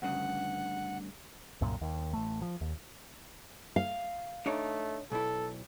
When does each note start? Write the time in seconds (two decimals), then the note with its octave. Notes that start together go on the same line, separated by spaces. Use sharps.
0.02 D2 G2 C#3 F#5
1.61 C2 F#2 A#2
1.81 D#2
2.13 A1 A3
2.42 F3
2.61 D#2
3.76 F5
4.46 A3 D4 D#4 C#5
5.11 B1 E4 A4